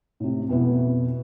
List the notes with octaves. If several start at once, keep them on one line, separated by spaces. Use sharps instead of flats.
A2 C3
F2 B2 B3 E4